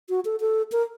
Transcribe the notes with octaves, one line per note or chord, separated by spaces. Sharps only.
F#4
A4
A4
A#4